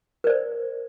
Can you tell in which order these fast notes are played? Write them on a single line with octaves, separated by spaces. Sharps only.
A#4 D5 C5